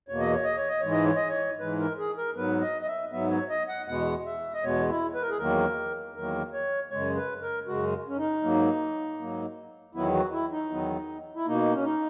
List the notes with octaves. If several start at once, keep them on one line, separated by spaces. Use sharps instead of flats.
E2 B2 A#3 C#5
D#5
C#5
D#5
C#5
D#5
G#2 E3 G#3 C#5
D#5
C#5
D#5
C#5
G#2 E3 G#3 B4
A#4
G#4
A#4
G#2 F#3 B3 B4
D#5
D#5
E5
G#2 F#3 B3 E5
C#5
D#5
F#5
E2 B2 G#3 B3 F#5
E5
D#5
E2 B2 G#3 B3 C#5
E4
B4
A#4
G#4
E2 D#3 F#3 A#3 A#4
E2 D#3 F#3 A#3 A#4
C#5
F#2 C#3 G#3 C#5
B4
A#4
F#2 C#3 G#3 F#4
C#4
D#4
G#2 F#3 A#3
G#2 F#3 A#3
E2 D#3 F#3 B3 E4
F#4
E4
D#4
E2 D#3 F#3 B3
E4
B2 A#3 D#4
C#4
D#4